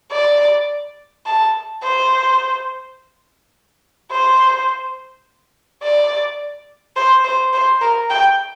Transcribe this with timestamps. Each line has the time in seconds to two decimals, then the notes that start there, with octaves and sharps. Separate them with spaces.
0.12 D5
1.26 A5
1.83 C5
4.11 C5
5.83 D5
6.96 C5
7.24 C5
7.53 C5
7.81 A#4
8.10 G5